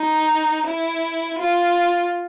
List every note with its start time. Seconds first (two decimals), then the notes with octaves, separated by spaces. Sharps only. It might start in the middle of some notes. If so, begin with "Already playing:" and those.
Already playing: D#4
0.66 E4
1.39 F4